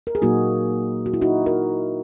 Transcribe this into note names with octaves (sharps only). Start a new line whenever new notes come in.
A#4
G#4
A#2 F#3 A#3 D#4 F#4
F#4
E4
D#4 F#4
F#4 A#4